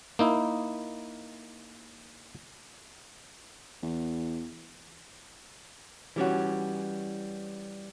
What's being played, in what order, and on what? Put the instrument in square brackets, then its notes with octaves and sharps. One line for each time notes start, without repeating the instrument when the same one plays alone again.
[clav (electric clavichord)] A#3 D#4 E4
[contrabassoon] E2
[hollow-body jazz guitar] E3 G3 C#4 F#4